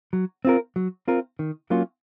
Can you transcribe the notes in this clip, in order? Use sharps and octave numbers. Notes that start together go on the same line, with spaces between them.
F#3
C4 F4 A#4
F#3
C4 F4 A#4
D#3
F#3 A#3 C#4 F4